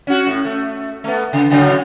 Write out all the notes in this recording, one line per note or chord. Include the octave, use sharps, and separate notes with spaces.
C#4 F#4
A2
A3
A3 B3
C#3
A2 C#3 F#3